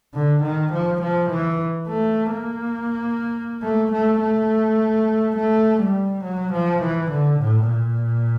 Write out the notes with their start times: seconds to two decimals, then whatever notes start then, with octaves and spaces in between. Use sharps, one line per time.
0.14 D3
0.43 D#3
0.72 F3
1.01 F3
1.30 E3
1.88 A3
2.32 A#3
3.63 A3
3.92 A3
4.21 A3
5.37 A3
5.81 G3
6.24 F#3
6.53 F3
6.82 E3
7.11 D3
7.40 A2
7.69 A#2